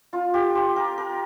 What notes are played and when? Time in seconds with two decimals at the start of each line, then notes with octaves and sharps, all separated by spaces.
0.13 F4
0.34 G4
0.55 C5
0.76 A#4
0.98 A#4